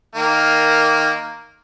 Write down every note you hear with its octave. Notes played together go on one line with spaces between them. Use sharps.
D#3 A#3